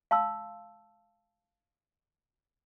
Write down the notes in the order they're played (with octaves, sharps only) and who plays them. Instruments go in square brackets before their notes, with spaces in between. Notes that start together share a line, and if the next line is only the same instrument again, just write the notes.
[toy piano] F5 A5 C6 E6